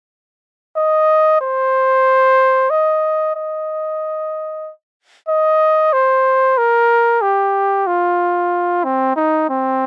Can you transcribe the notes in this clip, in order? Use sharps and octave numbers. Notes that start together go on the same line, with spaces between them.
D#5
C5
D#5
D#5
D#5
C5
A#4
G4
F4
C4
D#4
C4